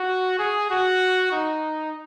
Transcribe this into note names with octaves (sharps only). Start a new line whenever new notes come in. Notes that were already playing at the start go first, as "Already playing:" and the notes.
Already playing: F#4
G#4
F#4
D#4